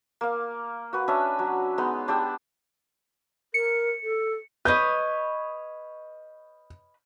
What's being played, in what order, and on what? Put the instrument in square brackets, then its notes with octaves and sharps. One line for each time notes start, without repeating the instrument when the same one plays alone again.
[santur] A#3 F5
F#4 B4
C#4 D4 D#5 E5
F#3
G#3 B3 D#4
D4 G4 G5 E6
[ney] A#4 [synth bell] C#7
[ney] A4
[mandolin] B4 C#5 D#5 [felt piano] G6